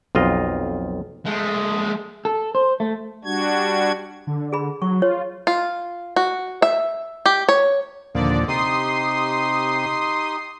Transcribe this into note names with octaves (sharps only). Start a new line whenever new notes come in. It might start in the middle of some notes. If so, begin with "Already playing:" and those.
B1 F2 F4 D#5
G#3 A3
A4
C5
A3
G3 D4 F#4 G#6
D3
G#4 B5
F#3 C#6
F4 C#5
F4
F#4
E5
G4
C#5
D#2 A#2 D3 F3 D5 D#5
C3 D#4 G4 C6 D#6 C7